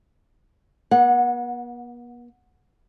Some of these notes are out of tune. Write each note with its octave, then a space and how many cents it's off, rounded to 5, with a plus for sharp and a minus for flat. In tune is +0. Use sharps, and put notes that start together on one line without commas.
B3 -45 F#5 -20